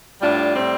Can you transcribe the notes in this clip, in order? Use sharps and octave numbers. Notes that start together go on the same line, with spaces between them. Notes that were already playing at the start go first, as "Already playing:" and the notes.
A2 G3 D4 F4
A2 G3 C4